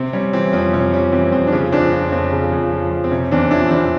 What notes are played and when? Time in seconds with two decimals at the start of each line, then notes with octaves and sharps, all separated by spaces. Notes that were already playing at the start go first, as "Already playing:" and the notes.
Already playing: C3 C4
0.13 G3 C#4
0.33 E3 C4
0.53 F2 C#4
0.73 C3 C#4
0.92 G3 C#4
1.12 E3 C4
1.32 F2 C4
1.47 D4
1.52 C#3 C#4
1.72 F2 C4 D4
1.92 F3 C4
2.08 C#4
2.12 F2 C4
2.32 C#3
2.52 F2
2.72 F3
2.91 F2
3.04 C4
3.11 C3 C#4
3.31 E2 C4 D4
3.51 F3 D4 E4
3.71 E2 C4 D4